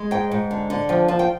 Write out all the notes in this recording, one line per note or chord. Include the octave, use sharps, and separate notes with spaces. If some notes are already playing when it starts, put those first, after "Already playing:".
Already playing: G#3
G#2 G5
G#2
D3
D3
F3 G5
F3 A5
G5